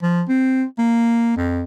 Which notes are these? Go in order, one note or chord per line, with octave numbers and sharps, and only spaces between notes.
F3
C4
A#3
F2